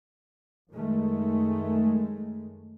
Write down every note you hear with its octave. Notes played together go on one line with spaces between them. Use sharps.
F#2 D#3 G#3 A3